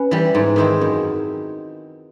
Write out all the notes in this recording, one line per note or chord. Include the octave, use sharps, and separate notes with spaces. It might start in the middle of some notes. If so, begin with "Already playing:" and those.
Already playing: C#4 B4
E3 G3
G#2
D#3 G#3 C4 E4
F#2